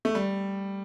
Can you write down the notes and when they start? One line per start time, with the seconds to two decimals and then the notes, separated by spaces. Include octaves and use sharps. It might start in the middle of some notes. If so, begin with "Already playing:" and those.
0.05 A3
0.15 G3